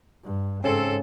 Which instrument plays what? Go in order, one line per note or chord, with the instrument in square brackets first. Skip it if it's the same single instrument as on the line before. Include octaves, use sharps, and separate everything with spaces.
[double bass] G2
[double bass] G#2 [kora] C#3 [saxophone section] C4 A4